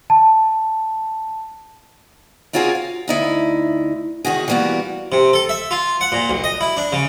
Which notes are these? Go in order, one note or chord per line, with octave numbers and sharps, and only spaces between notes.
A5
C4 C#4 F4 F#4 G#4 A#4
F5
D2 D#4 E4
E2 D#3 F#4 G#4
E3 G3 A#3 B3 F#4
C3
A4
E5
F4
F#5
A#2
B1
D#5
E4
D4
C#3